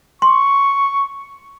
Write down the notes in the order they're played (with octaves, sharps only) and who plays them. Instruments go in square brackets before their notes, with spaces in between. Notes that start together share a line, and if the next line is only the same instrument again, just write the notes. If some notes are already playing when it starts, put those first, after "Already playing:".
[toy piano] C6 [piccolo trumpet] C#6